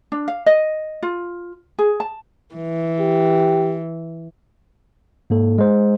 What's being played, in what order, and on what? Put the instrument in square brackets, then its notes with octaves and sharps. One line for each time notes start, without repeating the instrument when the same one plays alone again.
[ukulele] D4
F5
D#5
F4
G#4
A5
[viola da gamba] E3
[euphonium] G4
[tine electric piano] G#2 A#3 A4
G#3 C5